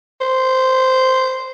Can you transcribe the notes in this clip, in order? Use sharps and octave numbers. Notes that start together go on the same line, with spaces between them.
C5